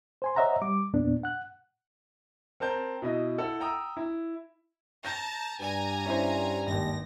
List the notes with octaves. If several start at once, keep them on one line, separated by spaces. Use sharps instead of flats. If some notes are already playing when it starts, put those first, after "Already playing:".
C5 G#5 C6
C5 C#5 D#5 E5 F#5 A#5
G3 D6
E2 A#2 B3 D4
F#5 F#6
C4 A#4 A5 G6
B2 E4 D#5
E4 A4 F#5
G5 A#5 D#6 E6
E4
A5 A#5 G6 A#6
G2 G#5 A#5
C#4 E4 C5
G#1 D#2 A#6